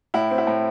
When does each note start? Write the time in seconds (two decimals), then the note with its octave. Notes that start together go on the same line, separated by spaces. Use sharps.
0.14 A2 E4
0.31 C4
0.38 E4
0.47 A2